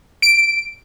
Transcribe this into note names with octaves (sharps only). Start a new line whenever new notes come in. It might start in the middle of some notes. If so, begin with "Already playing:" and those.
D7